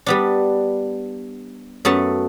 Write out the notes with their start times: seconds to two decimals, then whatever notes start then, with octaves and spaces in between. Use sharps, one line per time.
0.06 G3 B3 D4
1.85 F#2 A3 B3 A5